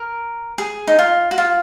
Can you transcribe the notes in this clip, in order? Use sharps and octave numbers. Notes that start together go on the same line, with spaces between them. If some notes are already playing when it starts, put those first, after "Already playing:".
Already playing: A#4
G#4
D#4
F4
F#4
F4